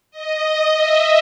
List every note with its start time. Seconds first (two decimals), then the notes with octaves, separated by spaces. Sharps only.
0.11 D#5
0.76 E5